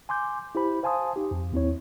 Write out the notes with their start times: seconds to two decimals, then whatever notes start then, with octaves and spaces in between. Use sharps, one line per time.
0.09 G#5 C6 D6 G6
0.55 E4 G4 C5 B5
0.83 C5 F5 G#5 A5 C6 D#6
1.16 D#4 G4
1.31 F2
1.52 D#2 C4 E4 C#5